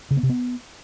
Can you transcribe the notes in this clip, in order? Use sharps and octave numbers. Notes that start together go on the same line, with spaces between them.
C#3
B3
C3
B3